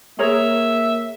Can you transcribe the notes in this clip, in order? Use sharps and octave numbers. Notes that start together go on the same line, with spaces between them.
A#3 G#4 A#4 C#5 E5